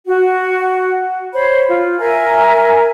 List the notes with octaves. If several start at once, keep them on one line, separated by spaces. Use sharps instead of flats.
F#4
C5 C#5 B5
F4
A#4 E5 G#5